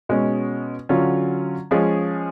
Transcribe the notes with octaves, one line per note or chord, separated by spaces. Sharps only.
B2 G#3 C#4
D3 F#3 C#4 F4
F3 G#3 C#4 F4 G#4